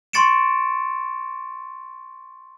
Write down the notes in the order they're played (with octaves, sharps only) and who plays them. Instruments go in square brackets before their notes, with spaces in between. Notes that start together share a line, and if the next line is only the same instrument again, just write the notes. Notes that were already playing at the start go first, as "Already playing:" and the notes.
[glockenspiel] C6 C#6 A6 C#7 D7 E7